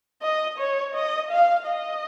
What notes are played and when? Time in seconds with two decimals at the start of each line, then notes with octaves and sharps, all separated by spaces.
0.22 D#5
0.58 C#5
0.94 D#5
1.31 F5
1.67 D#5